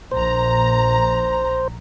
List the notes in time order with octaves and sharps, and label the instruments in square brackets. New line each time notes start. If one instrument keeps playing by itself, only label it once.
[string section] A#1 A#5 [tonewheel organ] C5